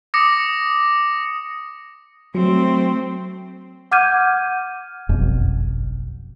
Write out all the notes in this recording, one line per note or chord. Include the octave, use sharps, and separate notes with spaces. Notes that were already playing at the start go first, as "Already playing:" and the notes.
D6 D#6 A#6 C#7
F#3 A3 C4
F#5 D6 F6 G6 G#6 D#7
F#1 B1 F2